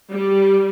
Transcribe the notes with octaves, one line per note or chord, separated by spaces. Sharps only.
G3